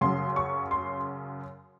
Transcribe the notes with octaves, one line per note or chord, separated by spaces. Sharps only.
F#2 C#3 F#3 C6
C#6
C6